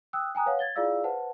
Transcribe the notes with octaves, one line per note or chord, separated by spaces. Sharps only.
G5 D#6 E6 F#6
G5 G#5 A#5 D#6 F#6
B4 C#5 F5 F#5
G#6 A6 G7
E4 F4 G#4 D5 F5 E6
B4 C5 F#5 A5